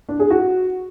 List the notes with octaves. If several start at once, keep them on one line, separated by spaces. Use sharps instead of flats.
D4
G#4
F#4